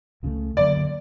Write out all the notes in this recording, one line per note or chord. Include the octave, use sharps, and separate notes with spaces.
C#2 C#3 E3 A3
F#2 D3 F#3 A#3 D5